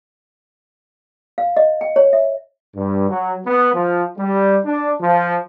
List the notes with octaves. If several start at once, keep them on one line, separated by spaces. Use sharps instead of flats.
F5
D#5
G5
C#5
E5
G2
F#3
B3
F3
G3
D4
F3